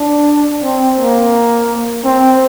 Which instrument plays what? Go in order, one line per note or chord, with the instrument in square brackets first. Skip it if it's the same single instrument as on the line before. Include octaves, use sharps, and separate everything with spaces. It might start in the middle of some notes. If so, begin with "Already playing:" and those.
Already playing: [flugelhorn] D4
C4
A#3
C4